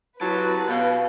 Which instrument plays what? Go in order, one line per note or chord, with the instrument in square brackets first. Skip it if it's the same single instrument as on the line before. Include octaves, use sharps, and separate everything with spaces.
[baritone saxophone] F#3 [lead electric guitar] E4 G4 [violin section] B4 [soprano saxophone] A5
[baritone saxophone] B2 [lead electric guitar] C#5 F5